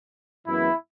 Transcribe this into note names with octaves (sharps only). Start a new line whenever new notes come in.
F#2 E3 G#3 B3 E4